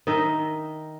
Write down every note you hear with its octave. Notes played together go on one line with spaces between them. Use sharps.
D#3 D#4 D#5 E5